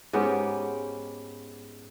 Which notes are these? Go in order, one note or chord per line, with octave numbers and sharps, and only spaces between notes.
G#2 B3 C#4 G4